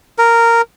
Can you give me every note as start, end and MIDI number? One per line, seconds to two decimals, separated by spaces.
0.18 0.62 70